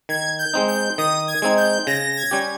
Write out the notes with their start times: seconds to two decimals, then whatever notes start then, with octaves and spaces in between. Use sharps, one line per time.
0.09 D#3 G#6
0.39 G6
0.54 G#3 C4 D#4
0.68 G6
0.98 D#3 D#6
1.28 G#6
1.42 G#3 C4 D#4
1.57 G6
1.87 C#3 A#6
2.12 A#6
2.17 G#6
2.31 G3 C#4 G4